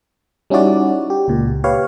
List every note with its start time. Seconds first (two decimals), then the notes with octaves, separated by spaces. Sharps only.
0.50 G3 C#4 D#4 E4 F#4 D5
1.10 G4
1.28 C#2 A#2
1.64 G4 B4 C#5 F5